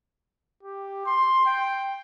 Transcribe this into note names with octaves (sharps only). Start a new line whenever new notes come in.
G4
C6
G5